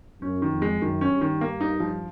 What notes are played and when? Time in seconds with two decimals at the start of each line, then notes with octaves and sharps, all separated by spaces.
0.21 F#2 C#4
0.42 D#3
0.51 F2
0.62 G#3
0.81 F#2 D#3
1.01 C#4
1.10 G2
1.21 D#3
1.41 A#3
1.61 D#4
1.80 F3